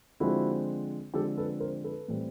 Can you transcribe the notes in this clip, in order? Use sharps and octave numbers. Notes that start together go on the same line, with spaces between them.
D3 F3 G#3 C4 E4 F#4
D3 F3 G#3 C4 G4 A4
A4 B4
A#4 C5
A4 B4
A2 E3 G3 C4